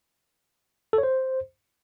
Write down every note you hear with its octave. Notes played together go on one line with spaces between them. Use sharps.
A4
C#5
C5